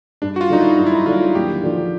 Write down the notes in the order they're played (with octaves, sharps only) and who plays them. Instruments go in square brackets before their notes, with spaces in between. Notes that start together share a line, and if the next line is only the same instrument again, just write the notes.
[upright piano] G2 [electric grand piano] D4
[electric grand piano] F#4
F4
[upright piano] D3 F#3 [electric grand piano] D#4
[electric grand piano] E4
[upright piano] G2 [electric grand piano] D#4
[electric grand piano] E4
D#4
[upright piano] D3 F#3 [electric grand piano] F4
[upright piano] D#2 [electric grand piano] G4
[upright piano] D3 F3